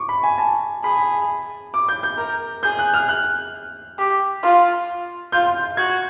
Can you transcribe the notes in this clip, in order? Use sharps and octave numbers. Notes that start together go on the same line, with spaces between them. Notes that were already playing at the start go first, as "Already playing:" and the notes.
Already playing: C#6 D6
B5
G#5
A5
G#4 B5
D6
G6
G6
A#4
G#4 G6
F#6
F6
F#6
G4
F4
F4 G6
F#4 G#6